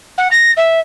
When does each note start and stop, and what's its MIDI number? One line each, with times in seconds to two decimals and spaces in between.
0.18 0.28 78
0.31 0.52 94
0.57 0.80 76